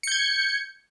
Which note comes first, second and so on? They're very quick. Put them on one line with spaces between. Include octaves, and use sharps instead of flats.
C#7 G6 G#6